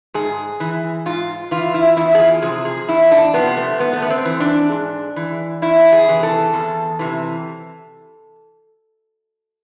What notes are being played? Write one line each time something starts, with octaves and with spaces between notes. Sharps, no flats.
G#2 G#4
E3
G#2 F4
E3 F4
E4
E2 E4
G#4
F4
C3 F3 G#4
G#4
E2 E4
D4
C3 F3 B3
A3
G#2 B3
A3
B3
C4
E3
D4
G#2
E3
E2 E4
G#4
C3 E3
A4
E2
C3 E3